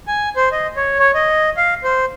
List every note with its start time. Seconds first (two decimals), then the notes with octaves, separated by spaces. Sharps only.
0.08 G#5
0.36 C5
0.52 D#5
0.77 C#5
0.99 C#5
1.15 D#5
1.57 F5
1.84 C5